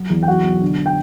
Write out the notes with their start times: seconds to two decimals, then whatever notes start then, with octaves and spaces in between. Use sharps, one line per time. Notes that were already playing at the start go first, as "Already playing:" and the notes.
Already playing: F#3
0.10 E2
0.23 G5
0.27 B1 F#4 F#5
0.44 B1
0.62 D3
0.86 G5